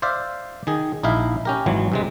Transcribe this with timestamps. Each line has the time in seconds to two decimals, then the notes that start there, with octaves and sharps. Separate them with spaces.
0.02 C5 D5 E5 F5
0.67 D#3 G#4
1.03 A#1 D#4 E4 E5 F5
1.45 C#4 G4 A#4
1.66 G#1 E3 F#3
1.92 G2 C3 G#3